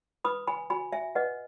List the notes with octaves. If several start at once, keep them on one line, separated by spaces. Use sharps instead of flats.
B4 B5 D#6
G#5 B5
F#4 G#5 B5
E5 G#5
B4 D#5 F#5